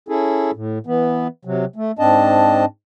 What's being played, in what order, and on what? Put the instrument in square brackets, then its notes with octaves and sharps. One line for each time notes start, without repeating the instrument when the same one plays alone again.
[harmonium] C#4 E4 G#4 A4
A2
E3 B3
C3 F#3
A3
G#2 C4 D4 D#5 A5